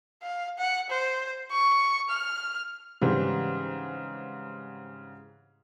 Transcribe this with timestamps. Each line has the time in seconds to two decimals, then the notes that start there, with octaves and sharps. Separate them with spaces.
0.23 F5
0.59 F#5
0.90 C5
1.51 C#6
2.10 F6
3.02 G#2 C#3 E3 G3 C4